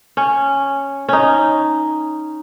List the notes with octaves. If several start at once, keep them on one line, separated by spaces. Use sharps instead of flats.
C#4
C#4 D#4